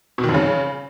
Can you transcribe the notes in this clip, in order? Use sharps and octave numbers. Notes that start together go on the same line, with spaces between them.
B2
D#3
F2
C#3